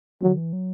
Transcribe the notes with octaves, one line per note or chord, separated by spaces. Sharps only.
D3 F#3
E3
F#3